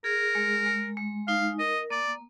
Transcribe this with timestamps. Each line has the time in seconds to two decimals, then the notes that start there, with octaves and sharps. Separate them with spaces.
0.04 G#4 A#4
0.35 G#3
0.66 G#3
0.97 G#3
1.28 D#4 F5
1.59 A#4 D#5
1.90 A#3 D5